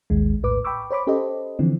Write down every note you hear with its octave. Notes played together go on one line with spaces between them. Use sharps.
A1 D#2 G#3
A#1 A2 B4 D6
G5 B5 C#6 D6 E6
C5 C#5 B5 D6
C#4 G4 A4 C5 D#5
D3 E3 F3 C4